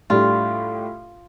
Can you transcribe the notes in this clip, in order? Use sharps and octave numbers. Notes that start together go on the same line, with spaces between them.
A2 G3 D4 F4 G4